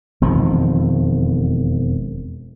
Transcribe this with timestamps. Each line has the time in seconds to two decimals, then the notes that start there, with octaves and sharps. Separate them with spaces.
0.21 E1 F2 D#3 F3